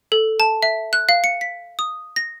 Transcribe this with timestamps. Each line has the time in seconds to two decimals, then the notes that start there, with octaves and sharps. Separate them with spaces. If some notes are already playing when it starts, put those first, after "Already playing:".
0.12 A4
0.40 A5
0.63 E5
0.93 F#6
1.09 F5
1.24 C#7
1.41 B6
1.79 D#6
2.16 A#6